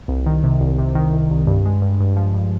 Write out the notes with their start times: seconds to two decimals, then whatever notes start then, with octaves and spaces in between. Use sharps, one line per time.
0.08 C2
0.26 D#3
0.44 C3
0.60 C2
0.79 C3
0.95 D#3
1.13 C2
1.31 C2
1.47 G2
1.65 G#3
1.82 G2
2.00 G2
2.17 F3
2.34 G2